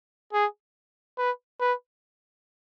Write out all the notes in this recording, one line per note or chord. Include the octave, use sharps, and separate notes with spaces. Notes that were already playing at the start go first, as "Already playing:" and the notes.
G#4
B4
B4